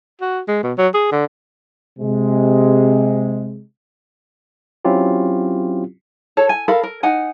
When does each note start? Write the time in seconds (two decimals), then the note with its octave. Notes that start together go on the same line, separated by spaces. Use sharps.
0.21 F#4
0.48 G#3
0.63 B2
0.78 F#3
0.94 G#4
1.12 D3
1.99 C3 G#3
4.85 F#3 C4 C#4 E4 F4 G4
6.37 A4 C#5
6.49 G#5
6.68 A4 A#4 F5 B5
6.83 A#4
7.03 D#4 F#5 G#5